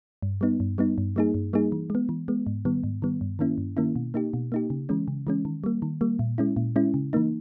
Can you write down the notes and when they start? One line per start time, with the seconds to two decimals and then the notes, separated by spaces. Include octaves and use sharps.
0.22 G2
0.41 G3 B3 D#4
0.60 G2
0.78 G3 B3 D#4
0.98 G2
1.16 G3 A#3 D#4 G#4
1.34 G2
1.53 G3 A#3 D#4 G#4
1.72 E3
1.90 G#3 B3
2.09 E3
2.28 G#3 B3
2.47 G#2
2.65 D#3 G3 B3
2.84 G#2
3.02 D#3 G3 B3
3.21 G2
3.39 D#3 A#3 C#4 E4
3.58 G2
3.77 D#3 A#3 C#4 E4
3.96 B2
4.14 A#3 D#4 G4
4.33 B2
4.52 A#3 D#4 G4
4.70 C#3
4.89 E3 G#3 C#4
5.08 C#3
5.27 E3 G#3 C#4
5.45 D#3
5.64 G3 A#3
5.82 D#3
6.01 G3 A#3
6.19 A#2
6.38 G#3 C#4 E4
6.57 A#2
6.76 G#3 C#4 E4
6.94 C#3
7.13 E3 A#3 D#4